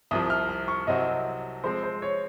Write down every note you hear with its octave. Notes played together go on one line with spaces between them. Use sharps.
C2 C3 F3 D#6
F6
F6
C#6
C2 C3 F#3 C4 F#4 D#5
F3 G#3 C4 C5
C5
C#5